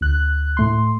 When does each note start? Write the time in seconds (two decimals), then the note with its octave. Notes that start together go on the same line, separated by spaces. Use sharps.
0.01 D2 F#6
0.57 A2 A3 C6